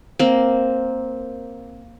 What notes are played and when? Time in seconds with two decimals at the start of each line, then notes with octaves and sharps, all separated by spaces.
0.19 A#3 C4